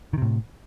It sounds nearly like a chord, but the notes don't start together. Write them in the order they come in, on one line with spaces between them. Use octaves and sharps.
D#3 C3 A2